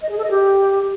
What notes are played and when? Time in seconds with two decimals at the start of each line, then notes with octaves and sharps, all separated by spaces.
0.02 D#5
0.09 G#4
0.16 A4
0.23 D#5
0.31 G4